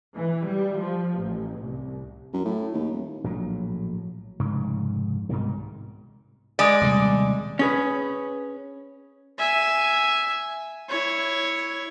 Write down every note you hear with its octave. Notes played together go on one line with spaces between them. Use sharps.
E3
G3
F3
A1
C2
F#2
A2
D#2
D#1
A#1 A2 F#3
F1 G#2 C#3
C2 G#2 B2 D#3
G#3 D5
D#1 C3 G3
C#4 G#4 B4
E5 G#5
E4 C#5